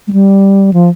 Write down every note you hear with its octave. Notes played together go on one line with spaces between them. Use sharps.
G#3
G3
F3